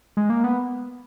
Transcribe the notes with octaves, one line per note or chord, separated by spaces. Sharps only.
G#3
A#3
B3